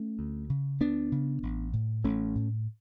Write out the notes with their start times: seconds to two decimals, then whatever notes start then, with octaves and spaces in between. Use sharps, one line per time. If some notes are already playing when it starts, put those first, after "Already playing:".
Already playing: A3 C#4
0.19 D2
0.50 C#3
0.81 D2 B3 D4
1.12 C#3
1.43 A1
1.73 A2
2.04 A1 A3 C#4
2.35 A2